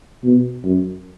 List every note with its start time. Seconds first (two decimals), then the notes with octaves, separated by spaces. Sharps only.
0.24 B2
0.64 F#2